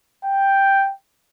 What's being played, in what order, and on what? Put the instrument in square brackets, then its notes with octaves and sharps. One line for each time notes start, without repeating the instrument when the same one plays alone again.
[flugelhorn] G5